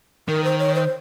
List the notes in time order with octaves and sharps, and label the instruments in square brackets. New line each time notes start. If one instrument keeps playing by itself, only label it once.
[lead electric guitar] D#3 [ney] A#4
[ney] C5
C#5
C5